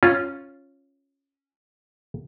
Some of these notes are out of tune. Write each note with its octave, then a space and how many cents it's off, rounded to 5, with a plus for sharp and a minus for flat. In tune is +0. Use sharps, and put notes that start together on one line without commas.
C#4 -5 F4 +0